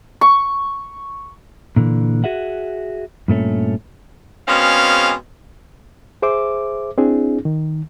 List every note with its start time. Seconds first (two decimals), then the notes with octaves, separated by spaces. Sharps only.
0.21 C#6
1.76 A#2 D3 E3
2.24 F#4 G#4 E5 F#5
3.28 G2 A#2 A3 C#4
4.48 B2 G#3 C4 C#4 G#4 F5
6.22 G#4 C5 E5 D6
6.98 C4 D4 E4 G#4
7.45 D#3